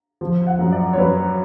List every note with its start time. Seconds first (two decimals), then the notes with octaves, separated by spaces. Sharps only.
0.21 F3
0.47 F#5
0.59 F#2
0.72 D5
0.93 C#5
0.97 F#2 B4